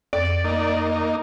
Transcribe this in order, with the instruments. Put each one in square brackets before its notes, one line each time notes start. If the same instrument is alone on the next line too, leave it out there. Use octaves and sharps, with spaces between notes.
[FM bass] F2 [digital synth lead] D5
[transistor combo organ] A#3 D#4